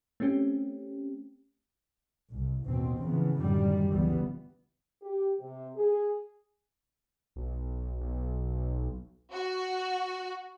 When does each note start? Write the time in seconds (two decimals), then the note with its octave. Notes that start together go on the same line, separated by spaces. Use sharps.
0.20 A3 C4 C#4 G4
2.29 C2
2.64 A1 D#2 B2 C4
3.00 C#3 E3 F3 B3
3.37 F#2 A2 D3 D#3 G3
3.93 G1 C#2 E3 G3 B3
5.02 G4
5.39 C3
5.76 G#4
7.36 B1
8.00 B1
9.31 F#4